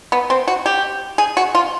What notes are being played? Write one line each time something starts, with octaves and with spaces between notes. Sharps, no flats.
B3
C4
F#4
G4
G#4
F#4
F4